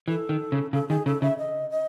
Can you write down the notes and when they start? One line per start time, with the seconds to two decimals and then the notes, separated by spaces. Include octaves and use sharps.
0.08 E3 A4
0.29 D#3
0.52 C#3
0.73 C#3 A4
0.89 D#3 G#4
1.06 C#3 A4
1.22 C#3 E5
1.38 D#5
1.70 D#5